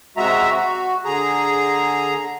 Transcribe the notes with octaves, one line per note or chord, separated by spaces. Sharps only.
C3 G#3 F#4 E5 A#5
F#4
D3 G#4 A#5